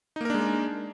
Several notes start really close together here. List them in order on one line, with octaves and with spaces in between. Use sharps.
D#4 A#3 A#4 D4 G#3